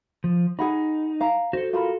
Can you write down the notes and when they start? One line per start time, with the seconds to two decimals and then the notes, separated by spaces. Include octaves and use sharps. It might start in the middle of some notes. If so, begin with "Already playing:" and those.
0.24 F3
0.59 D#4 G#4 F#5 B5
1.21 F5 A#5
1.53 F#4 A4 C5
1.73 F4 A#4 B5